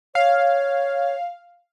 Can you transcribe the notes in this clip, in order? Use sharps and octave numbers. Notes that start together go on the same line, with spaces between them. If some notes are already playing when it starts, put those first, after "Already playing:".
C#5 F5